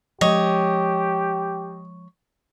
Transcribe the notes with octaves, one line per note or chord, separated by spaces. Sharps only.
F3 G#3 G4 C#5 D#5